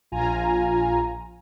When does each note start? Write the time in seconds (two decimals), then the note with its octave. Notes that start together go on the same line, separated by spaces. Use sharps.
0.12 A#1 F4 G#5 A#5